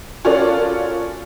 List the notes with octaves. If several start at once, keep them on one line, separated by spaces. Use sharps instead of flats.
C#4 F4 F#4 A4 A#4 D5